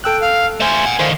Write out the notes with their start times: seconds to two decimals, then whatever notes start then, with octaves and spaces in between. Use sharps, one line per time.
0.04 A4 G5 E6 F#6
0.21 F5
0.60 A3 C5 G#5
0.86 D#5 F#5
0.99 D3 D#3 C5 F5